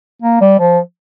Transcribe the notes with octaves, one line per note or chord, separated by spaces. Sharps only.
A#3
G3
F3